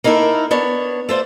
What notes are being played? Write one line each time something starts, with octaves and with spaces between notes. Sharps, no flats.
A#3 D#4 E4 A4 A#4
B3 D4 C#5
A3 F4 C5 D5